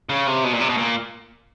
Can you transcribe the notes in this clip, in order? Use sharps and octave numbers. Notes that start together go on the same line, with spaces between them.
C#3
C3
B2
A#2
C3
B2
A#2